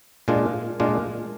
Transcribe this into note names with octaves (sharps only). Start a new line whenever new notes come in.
A#2 G#3 D4 F4
A#2 G#3 D4 F4